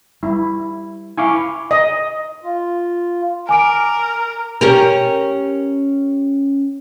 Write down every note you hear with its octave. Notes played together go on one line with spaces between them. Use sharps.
G3 E4
E4 F5 G#5 C#6 D6
D#5
F4
A#4 G#5 D6 D7
C#4 G4 A#4